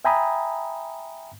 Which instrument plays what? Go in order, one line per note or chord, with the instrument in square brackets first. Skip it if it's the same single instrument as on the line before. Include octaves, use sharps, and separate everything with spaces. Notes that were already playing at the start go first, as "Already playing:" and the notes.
[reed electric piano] E5 G5 G#5 A#5 B5 D#6